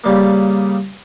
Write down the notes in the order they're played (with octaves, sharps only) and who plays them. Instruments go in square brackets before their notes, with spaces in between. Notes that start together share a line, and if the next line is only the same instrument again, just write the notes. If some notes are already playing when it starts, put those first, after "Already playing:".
[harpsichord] C#3 G3 A#3